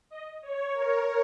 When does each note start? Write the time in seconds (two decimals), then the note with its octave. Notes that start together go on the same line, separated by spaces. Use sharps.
0.10 D#5
0.42 C#5
0.73 A#4